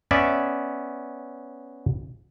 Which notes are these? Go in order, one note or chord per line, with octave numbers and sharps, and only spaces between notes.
B3 C#4 D5 E5